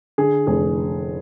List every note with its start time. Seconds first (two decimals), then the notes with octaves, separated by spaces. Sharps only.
0.18 D3 G#4
0.47 F1 G#4